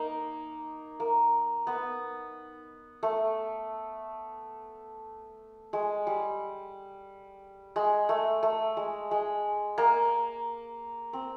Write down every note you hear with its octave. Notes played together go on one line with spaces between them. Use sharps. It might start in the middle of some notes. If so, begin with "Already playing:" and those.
Already playing: A#3 D#4
A#3
B3
A3
G#3
G3
G#3
A3
A3
G#3
G#3
A#3
C4